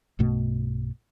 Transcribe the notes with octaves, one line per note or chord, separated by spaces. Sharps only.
B1 G2 B2 A3